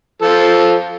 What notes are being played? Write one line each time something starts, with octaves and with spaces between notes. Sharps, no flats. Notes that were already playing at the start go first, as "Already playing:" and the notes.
F3 F4 A4